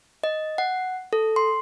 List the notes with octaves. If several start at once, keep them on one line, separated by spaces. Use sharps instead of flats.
D#5
F#5
A4
C6